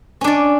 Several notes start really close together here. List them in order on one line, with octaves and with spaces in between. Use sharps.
C#4 D4 D5